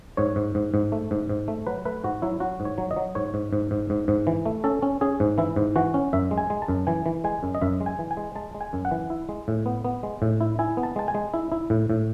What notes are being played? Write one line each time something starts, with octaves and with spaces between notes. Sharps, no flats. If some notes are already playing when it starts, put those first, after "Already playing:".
G#2 C#5
G#2
G#2
G#2
A3
G#2
G#2
A3
F#3 B4
A3 B4
G#2 F#4
F#3 E4
F#3 F#4
G#2
C#5
F#3
D#5
F#3
G#2 C#5
G#2
G#2
G#2
G#2
G#2
E3
A3
C#4 A4
C#4
C#4 G#4
G#2
E3 E4
G#2
E3 F#4
C#4
F#2 E5
G#3
G#5
G#3
A5
F#2
E3 G#5
E3
G#3 G#5
F#2
D#5
F#2 E5
G#3
G#5
E3
G#5
G#3
G#3 A5
G#3
G#5
F#2
F#5
E3
E4
G#3
A2
B3
B3
G#3
A2
E4
E4 G#5
B3
A5
G#3 A5
G#5
G#3
E4
E4
A2
A2